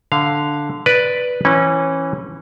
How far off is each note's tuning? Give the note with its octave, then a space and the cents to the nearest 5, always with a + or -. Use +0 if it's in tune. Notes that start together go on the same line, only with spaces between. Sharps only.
D3 +0 F5 +0
B4 +0 D5 +0
E3 +0 C#4 -25